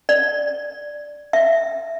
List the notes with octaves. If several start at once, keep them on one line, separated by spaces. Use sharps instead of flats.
D5
E5